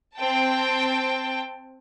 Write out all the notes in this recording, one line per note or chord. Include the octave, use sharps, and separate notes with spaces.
C4 G5 A5